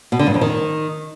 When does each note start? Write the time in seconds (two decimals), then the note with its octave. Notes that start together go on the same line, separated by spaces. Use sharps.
0.12 B2
0.19 D3
0.27 G2
0.34 F2
0.41 D#3